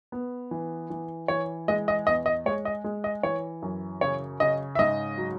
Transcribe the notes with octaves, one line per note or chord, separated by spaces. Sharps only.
B3
E3
E3
E3 C#5
G#3 D#5
D#5
E2 D#5
D#5
G#3 C#5
D#5
G#3
D#5
E3 C#5
F#2
C#3 C#5
C#3 D#5
E5
G#2 D#5
F#3